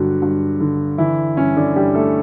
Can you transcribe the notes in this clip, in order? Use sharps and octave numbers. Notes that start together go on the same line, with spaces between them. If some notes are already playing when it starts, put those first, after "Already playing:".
Already playing: G2 D3 F#3 F#4
G2
D3
D3 E3 E4
G2 C#4
D3 D4
G2 G3 G4
A3 A4